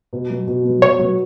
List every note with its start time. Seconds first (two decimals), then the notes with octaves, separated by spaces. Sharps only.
0.13 B2
0.30 F#3 B3
0.48 B2
0.64 F#3 B3
0.82 B2 C#5
0.99 F#3 B3